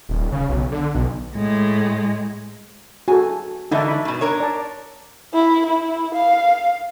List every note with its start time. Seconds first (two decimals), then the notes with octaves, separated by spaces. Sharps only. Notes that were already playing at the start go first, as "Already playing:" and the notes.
0.09 D#1
0.32 C#3
0.49 B1
0.72 D3
0.94 B1
1.35 A2 G#3
3.08 F#4 G#4 A4 G#5
3.71 D3 E3 A3 D#4 E5 A5
3.88 B5
4.05 G2 B2
4.21 D4 A#4 C#5
4.40 D5 A5
5.34 E4
5.66 E4
6.14 F5